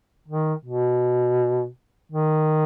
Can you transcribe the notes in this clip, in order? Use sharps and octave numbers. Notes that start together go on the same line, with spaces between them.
D#3
B2
D#3